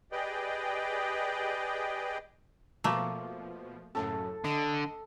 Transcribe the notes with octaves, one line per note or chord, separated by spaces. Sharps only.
G4 G#4 B4 D5 D#5 G5
B2 F3 A3 A#3
F#2 A2 C#3 A4
D3 D#5